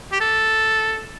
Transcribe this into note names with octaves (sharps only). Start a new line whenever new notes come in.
G4
A4